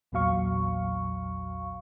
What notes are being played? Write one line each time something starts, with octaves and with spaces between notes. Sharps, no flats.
A#1 E2 A#2 F#3 F5 C#6